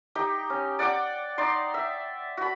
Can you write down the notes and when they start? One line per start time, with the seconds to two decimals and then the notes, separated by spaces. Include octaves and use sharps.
0.15 D#4 G4 G5
0.50 C#4
0.79 D5 F#5 G5 D6
1.38 D#4 D5 C6
1.74 E5
2.37 F#4 B5